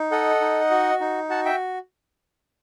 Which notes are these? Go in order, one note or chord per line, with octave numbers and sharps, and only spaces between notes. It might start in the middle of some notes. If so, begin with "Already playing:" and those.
Already playing: D#4
A4 D#5 F#5
D#4
F#4
D#4
F#4 F#5 A5
E5 G5